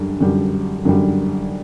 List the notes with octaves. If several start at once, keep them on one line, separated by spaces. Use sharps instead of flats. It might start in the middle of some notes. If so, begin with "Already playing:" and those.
Already playing: F#2 D3 G3
F#2 D3 G3
F#2 D3 G3